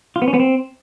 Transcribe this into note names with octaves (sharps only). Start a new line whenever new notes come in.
F4
B3
C#4
B3
C4